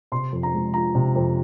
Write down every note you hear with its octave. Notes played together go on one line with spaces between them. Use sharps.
C3 C6
F2
A#5
G#3
F3 A#5
C3
F2